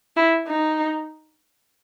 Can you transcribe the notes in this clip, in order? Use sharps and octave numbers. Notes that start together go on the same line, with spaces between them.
E4
D#4